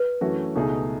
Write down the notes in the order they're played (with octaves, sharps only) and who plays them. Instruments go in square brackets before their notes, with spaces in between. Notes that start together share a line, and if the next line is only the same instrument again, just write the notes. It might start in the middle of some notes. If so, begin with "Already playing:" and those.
Already playing: [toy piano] B4
[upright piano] F#2 E3 A3 C#4 F#4
C#2 B2 A3 D#4 G#4